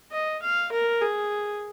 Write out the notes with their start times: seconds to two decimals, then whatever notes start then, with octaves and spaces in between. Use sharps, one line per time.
0.11 D#5
0.42 F5
0.72 A#4
1.01 G#4